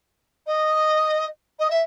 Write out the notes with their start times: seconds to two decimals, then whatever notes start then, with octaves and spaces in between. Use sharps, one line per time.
0.46 D#5
1.59 D#5
1.70 E5